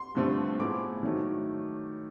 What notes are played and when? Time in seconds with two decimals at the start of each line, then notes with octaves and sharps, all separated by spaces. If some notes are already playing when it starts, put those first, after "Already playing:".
Already playing: C6
0.15 G2 D3 F3 A3 C4
0.59 A2 F3 G#3 B3 E4 D6
1.03 D#3 F#3 A3